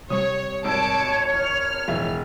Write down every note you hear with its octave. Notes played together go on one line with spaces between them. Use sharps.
C3 G3 C#5 D#6
G#1 C#5 A5 E6 D7
E2 F6
E1 A2 E3 F3 E5